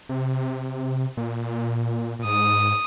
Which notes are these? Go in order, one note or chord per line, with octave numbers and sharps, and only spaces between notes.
C3
A#2
A#2
G#2 D#6